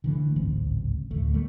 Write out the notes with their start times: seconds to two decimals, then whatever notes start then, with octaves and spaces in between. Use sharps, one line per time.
0.04 D3 E3 A3
0.36 D1 G#1 C#2 C4
1.11 D2 A2 A3
1.34 G3 A3 A#3